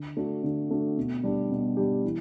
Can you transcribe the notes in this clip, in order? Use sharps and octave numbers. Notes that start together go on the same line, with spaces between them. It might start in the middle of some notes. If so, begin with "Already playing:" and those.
Already playing: D3
A3 D4 F#4
D3
A3 D4 F#4
B2
G3 D4 G4
B2
G3 D4 G4
E3